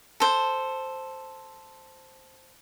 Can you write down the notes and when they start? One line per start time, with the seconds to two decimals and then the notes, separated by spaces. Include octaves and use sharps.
0.20 A4 C5